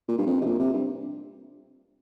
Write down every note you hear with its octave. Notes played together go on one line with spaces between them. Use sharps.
A#2
G2
F2
C3
A#2
C3
G2